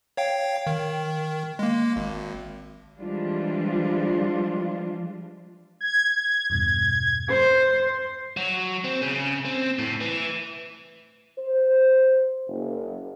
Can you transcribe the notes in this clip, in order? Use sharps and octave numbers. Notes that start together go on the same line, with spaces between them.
C#5 F5 G5
D#3
G#3 A#3
G#1
E3 F3 G3 G#3 D4 F4
G#6
E2 G2 B2
C5
F#3
C4
C#3
C4
A2
E3
C5
F#1